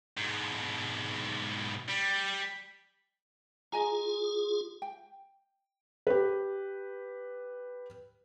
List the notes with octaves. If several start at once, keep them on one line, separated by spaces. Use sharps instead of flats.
G#2 B2
G3
F4 G#4 D#5 G#5 A#5
G5
G4 B4